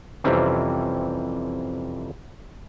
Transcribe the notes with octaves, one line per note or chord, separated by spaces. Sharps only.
F2 C3 E3 G3 C4 C#4